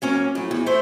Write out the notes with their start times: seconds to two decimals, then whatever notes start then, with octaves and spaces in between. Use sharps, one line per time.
0.02 F#3 A#3 C#4
0.35 A2 F#3
0.51 E2
0.66 A3 D4 C5 E5